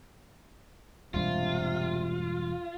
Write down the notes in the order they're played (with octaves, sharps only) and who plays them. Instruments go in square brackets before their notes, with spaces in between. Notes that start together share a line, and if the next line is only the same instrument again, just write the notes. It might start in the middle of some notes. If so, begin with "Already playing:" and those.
[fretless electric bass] E1 G2 G3 [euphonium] C3 [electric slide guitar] F4